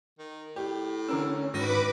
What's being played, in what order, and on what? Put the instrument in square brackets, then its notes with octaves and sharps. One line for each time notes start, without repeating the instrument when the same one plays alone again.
[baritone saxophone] D#3
[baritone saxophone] A2 [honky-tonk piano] G4
[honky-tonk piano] D3 A#4 E6 [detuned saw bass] C#4
[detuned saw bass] G#2 [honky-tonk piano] D#3 A#6 [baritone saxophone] F#4 [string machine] B4 B5 D6